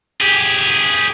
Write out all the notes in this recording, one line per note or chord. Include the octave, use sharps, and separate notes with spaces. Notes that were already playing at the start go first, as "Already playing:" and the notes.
G4 G#4